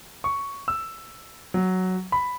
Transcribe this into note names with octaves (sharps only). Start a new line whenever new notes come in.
C#6
E6
F#3
B5